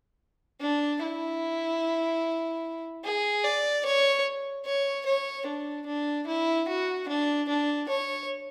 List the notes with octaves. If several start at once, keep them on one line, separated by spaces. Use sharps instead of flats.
D4
E4
G#4
D5
C#5
C#5
C#5
D4
D4
E4
F#4
D4
D4
C#5